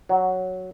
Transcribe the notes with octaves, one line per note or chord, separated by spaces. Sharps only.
F#3